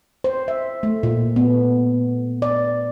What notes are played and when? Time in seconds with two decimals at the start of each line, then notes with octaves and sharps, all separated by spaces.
0.24 C5
0.48 E5
0.83 A3
1.03 A#2
1.36 B3
2.42 D5